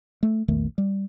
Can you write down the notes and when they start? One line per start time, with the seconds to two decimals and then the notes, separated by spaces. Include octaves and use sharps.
0.23 A3
0.48 A#1 E2 D#3 A3
0.78 G3